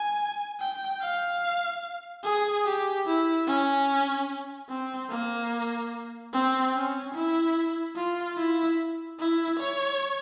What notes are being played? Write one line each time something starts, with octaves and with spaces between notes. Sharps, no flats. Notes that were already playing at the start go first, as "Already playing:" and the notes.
Already playing: G#5
G5
F5
G#4
G4
E4
C#4
C4
A#3
C4
C#4
E4
F4
E4
E4
C#5